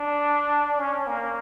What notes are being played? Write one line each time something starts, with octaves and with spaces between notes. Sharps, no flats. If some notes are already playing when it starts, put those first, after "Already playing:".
Already playing: D4
C#4
A#3